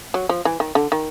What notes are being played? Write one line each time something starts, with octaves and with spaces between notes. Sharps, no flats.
F#3
F3
E3
D#3
D3
D#3